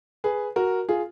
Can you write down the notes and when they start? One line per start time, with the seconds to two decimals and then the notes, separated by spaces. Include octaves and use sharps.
0.24 G#4 B4
0.56 F#4 A#4
0.89 F4 G#4